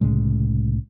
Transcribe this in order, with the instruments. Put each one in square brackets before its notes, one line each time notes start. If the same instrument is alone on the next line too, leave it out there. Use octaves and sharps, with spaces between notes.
[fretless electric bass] C2 A2 C#3 G#3